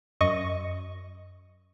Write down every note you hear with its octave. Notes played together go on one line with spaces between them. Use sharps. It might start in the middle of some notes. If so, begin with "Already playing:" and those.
F#2 D#5 C#6